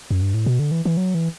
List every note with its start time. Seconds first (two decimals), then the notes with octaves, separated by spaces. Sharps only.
0.11 F#2
0.22 G2
0.34 A2
0.46 B2
0.59 D3
0.71 E3
0.85 E3
0.97 F#3
1.15 E3